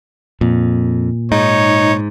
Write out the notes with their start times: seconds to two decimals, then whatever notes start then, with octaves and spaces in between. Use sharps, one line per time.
0.41 F2 A#2
1.32 G#2 D#4 C#5